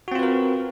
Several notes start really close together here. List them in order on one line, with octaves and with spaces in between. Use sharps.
F#4 C4 F4 B4 A#4